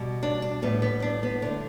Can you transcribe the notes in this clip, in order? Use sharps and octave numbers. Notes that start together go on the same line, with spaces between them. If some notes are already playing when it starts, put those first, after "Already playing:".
Already playing: B2 G3
D4
D4
A2 G3 B3
B3
D4
B3
D3 A3 D4